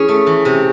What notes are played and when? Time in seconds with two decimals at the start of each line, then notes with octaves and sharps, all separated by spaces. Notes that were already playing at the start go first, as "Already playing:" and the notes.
Already playing: E3 C#4 G#4
0.09 A3
0.27 E3
0.45 C3